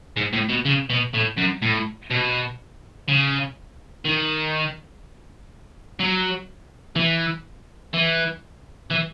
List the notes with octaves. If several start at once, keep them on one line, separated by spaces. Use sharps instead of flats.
G#2
A2
B2
C#3
B2
A2
F#2
A2
B2
C#3
D#3
F#3
E3
E3
E3